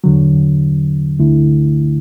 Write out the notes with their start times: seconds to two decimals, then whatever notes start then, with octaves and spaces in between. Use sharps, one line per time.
0.04 E2 D3 F#3
1.19 D2 D3 A3 E4